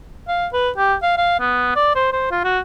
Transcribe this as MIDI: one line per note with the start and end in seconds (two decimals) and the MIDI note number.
0.28 0.47 77
0.53 0.70 71
0.77 0.95 67
1.02 1.17 77
1.18 1.40 77
1.40 1.73 59
1.76 1.92 74
1.95 2.12 72
2.13 2.28 72
2.31 2.44 65
2.44 2.60 66